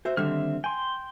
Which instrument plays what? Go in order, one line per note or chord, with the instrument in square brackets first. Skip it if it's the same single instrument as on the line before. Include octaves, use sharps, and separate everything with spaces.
[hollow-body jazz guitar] F#4 C5 E5
[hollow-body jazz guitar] D3 D#3 G3 [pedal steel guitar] C4 E5 F6
[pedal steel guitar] G5 C6 [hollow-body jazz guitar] G#5